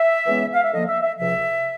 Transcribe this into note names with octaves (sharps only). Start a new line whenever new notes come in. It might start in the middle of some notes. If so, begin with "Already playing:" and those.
Already playing: E5
C#3 E3 G#3 B3
F5
E5
D3 F3 A#3 D#5
E5
E5
C#2 C3 F3 E5